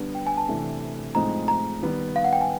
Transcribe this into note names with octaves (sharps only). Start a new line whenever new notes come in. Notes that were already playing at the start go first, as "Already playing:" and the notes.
Already playing: D3 G3 B3 D4
G5
G#5
A5
C3 E3 A3 D4
A2 F3 G#3 C4 D#4 A#5
A#5
D#3 G3 B3
F5
F#5
G5
G#5